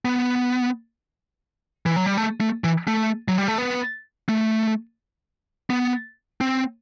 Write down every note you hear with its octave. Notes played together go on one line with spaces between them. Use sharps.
B3
E3
F#3
G3
A3
A3
E3
A3
F#3
G3
A3
B3
A3
B3
C4